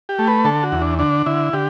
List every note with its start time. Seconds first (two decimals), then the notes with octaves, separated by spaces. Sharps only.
0.09 G4
0.19 A3
0.27 B4
0.45 D3 A4
0.63 F#4
0.72 E2
0.81 D4
0.99 D3 D4
1.26 D3 E4
1.53 D3 G4